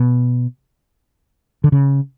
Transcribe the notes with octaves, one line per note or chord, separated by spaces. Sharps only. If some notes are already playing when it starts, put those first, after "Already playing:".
Already playing: B2
D3
C#3